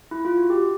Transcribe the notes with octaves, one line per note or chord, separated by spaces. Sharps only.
E4
F4
F#4
G4